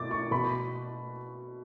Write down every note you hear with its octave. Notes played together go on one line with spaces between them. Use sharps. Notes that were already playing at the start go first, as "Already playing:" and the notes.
Already playing: B2 D6 A6
C#6
B2 B5